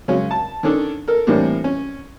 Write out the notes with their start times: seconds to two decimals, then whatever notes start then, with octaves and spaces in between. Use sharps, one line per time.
0.08 C#3 F#3 G#3 C#4
0.31 A5
0.63 D#3 C#4 D4 A4
1.08 A4 A#4
1.27 A2 E3 G3 A#3 C4 D4
1.64 C#4